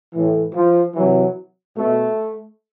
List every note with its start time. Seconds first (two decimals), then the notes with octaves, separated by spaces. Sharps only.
0.13 A2 E3
0.54 F3
0.95 C3 E3 F#3
1.76 B2 A3